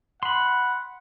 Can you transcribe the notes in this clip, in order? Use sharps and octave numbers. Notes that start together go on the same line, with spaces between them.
F#5 B5 C6